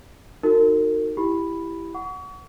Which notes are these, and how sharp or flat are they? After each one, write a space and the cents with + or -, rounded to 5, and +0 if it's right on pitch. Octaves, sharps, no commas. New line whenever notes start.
D#4 +0 F#4 -5 A#4 -35
E4 +10 G4 +0 B5 +0
F#5 +0 C#6 +40